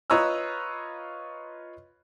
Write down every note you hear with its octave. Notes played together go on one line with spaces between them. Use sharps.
F4 B4 C#5 D#5 A#5 E6